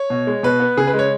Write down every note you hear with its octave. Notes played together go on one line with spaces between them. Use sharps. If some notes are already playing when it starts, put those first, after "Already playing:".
Already playing: C#5
B2
G#3
B2 B4
B3
C#3 G#4
B4
G#3
C#5